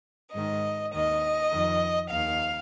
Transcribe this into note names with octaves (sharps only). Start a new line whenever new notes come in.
G#2 D#3 D#5
D#2 D#3 D#5
F2 D#3
D#2 D#3 F5